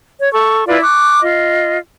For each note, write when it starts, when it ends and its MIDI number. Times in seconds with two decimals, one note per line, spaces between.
0.20 0.32 73
0.32 0.64 69
0.32 0.64 85
0.68 0.80 64
0.68 0.80 65
0.68 0.80 71
0.68 0.80 74
0.82 1.21 85
0.82 1.21 86
0.82 1.21 90
1.22 1.77 65
1.22 1.77 75